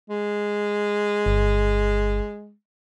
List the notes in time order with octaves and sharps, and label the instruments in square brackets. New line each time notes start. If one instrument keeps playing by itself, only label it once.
[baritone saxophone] G#3
[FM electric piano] G1